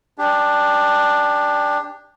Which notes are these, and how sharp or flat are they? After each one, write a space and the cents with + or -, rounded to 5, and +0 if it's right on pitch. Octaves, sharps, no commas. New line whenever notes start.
D4 +0 G4 +20